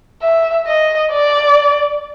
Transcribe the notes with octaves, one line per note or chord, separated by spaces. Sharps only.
E5
D#5
D5